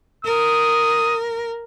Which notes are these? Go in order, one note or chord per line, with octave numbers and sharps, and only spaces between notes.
A#4 D#6